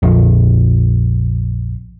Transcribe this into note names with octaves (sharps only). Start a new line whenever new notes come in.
A#1 F2